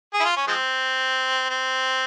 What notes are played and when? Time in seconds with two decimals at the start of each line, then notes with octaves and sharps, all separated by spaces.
0.13 G#4
0.20 E4
0.24 F4
0.36 C#4
0.47 F3 G#3 C4
1.50 C4